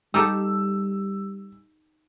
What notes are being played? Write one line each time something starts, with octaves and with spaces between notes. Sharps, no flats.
G3 D#4 G4 A4 E6